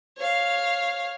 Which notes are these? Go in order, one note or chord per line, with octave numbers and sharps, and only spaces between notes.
C#5 F5